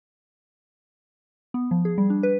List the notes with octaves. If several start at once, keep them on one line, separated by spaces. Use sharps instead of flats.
B3
F3
G#4
G3
D4
B4